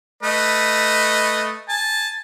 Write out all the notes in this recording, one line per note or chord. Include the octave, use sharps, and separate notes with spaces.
A3 B4 D#5
G#5 A5